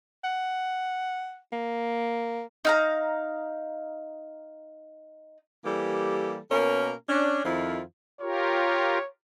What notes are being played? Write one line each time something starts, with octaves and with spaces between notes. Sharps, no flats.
F#5
A#3
D#4 F5 A#5
E3 G3 A#3 G4 A4
B2 A#3 C#4 A#4
C#4 D4
F2 D#3 F3 E4 F4
F4 G4 A#4 C#5